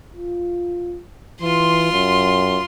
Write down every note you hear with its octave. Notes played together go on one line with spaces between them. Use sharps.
F4
E3 F4 C6
F#2